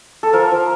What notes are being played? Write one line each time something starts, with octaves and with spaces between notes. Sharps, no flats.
A4
F3 A#4
F3